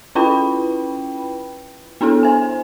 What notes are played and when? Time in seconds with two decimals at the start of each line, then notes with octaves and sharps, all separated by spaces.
0.15 C#4 E4 F4 B4 G5 B5
2.01 B3 D4 E4 A4
2.23 C5 G#5